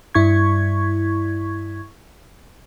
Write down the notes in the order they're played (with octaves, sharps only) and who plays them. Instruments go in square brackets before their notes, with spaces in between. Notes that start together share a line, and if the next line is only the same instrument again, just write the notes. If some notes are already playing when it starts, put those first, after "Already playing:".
[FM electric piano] G2 E4 C#6 G#6